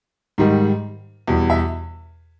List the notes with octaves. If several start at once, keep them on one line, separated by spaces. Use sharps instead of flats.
G#2 D#3 G3
E2 B2 G3
E5